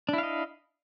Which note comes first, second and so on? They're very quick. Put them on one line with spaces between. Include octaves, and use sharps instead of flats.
D4 E4 F5 D#5